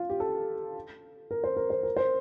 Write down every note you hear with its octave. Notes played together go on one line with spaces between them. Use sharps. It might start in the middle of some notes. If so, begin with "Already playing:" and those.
Already playing: F4
G4
A4
A#4
C5
A#4
C5
A#4
C5